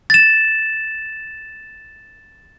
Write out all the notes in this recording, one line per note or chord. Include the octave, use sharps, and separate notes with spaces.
A6 E7